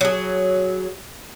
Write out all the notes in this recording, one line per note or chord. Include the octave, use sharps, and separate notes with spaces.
F#3 G#4